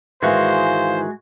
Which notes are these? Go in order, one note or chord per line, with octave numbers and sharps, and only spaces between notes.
G#2 D#3 E3 G#3 F#4 G#4 C5 F5